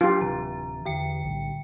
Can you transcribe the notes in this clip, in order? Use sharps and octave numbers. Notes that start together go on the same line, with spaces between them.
F#3 D4 F4 G4 A6
D1 C3 E3 A#5
E2 D3 E3 G5 C#7
B1 A2 G3